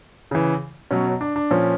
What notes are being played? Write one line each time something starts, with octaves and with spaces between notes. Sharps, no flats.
C#3 E3
B2 F#3 C#4
D4
D4
A#2 F3 C#4